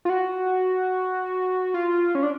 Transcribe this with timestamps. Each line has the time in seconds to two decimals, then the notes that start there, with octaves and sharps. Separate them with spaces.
0.05 F4
0.09 F#4
1.74 F4
2.15 C#4
2.23 D4